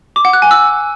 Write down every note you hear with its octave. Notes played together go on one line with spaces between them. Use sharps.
D6
F#5
F#6
G#5
E6